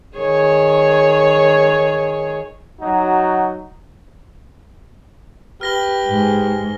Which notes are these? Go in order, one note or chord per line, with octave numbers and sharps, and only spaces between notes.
D#3 G#4 C#5
F#3 D#4 F#4
G4 B4 F6 A#6 G7
G#2 G#3